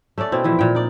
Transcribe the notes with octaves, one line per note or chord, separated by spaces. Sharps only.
A3 C#4 A4 D5
B2 C4 E4
A#2 E3 F3 E4
A#2 G5
D#4 D5